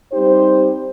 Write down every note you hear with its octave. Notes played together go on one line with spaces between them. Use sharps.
G3 C4 D#4 G4 C5